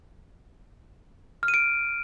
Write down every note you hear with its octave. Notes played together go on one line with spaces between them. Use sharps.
F6
D#7
D7